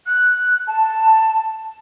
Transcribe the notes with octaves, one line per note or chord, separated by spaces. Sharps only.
F#6
A5